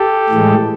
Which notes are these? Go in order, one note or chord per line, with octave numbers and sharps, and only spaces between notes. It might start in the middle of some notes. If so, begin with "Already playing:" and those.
Already playing: G4 A4
A2 E3 G#3